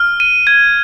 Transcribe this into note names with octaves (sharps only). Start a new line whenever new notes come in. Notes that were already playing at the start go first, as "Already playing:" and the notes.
Already playing: F6
D#7
G#6